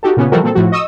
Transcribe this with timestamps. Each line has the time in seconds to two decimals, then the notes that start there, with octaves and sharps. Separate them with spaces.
0.03 D#4 F#4 G4 A4
0.17 A#2 C#3 B3 C#4
0.32 E3 F3 G3 F#4 A4 A#4
0.44 A#2 C4 A4
0.55 A2 F3 F#4
0.72 D#5 C#6 D#6 E6